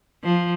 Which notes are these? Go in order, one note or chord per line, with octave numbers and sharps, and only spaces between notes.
F3